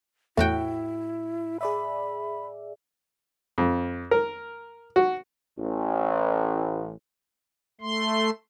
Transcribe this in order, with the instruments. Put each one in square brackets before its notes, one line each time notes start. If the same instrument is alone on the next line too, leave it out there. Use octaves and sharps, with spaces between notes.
[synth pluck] E2 A3 [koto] A2 F#4 G5 [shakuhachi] E4
[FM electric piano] G#4 D5 E5 [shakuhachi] B5
[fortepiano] F2
A#4
F#4
[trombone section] A1
[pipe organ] A3 C6